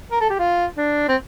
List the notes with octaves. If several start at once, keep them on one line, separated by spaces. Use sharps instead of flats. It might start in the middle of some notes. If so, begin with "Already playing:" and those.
A#4
A4
G4
F4
D4
C4